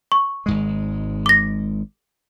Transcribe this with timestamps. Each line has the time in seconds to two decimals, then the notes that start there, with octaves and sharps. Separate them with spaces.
0.12 C#6
0.46 G#1 G#2 G#3
1.26 D6 A#6